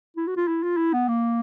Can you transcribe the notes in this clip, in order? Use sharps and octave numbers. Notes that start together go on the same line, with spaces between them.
E4
F#4
F4
E4
F4
E4
B3
A#3